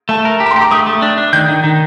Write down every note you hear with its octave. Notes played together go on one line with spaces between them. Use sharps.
A3 A5
A#4
G4
A#5
C6
G4 D6
A3 D#6
A3
D4
D4
D#3 G6
D#3
D#3